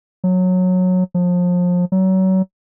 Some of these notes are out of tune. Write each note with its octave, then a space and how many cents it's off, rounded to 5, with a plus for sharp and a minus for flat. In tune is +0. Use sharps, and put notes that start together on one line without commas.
F#3 -15
F3 +30
F#3 +30